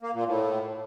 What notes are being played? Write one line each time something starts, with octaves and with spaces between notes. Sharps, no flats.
A#3
A#2
A2